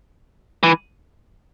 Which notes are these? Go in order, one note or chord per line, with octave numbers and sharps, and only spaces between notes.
E3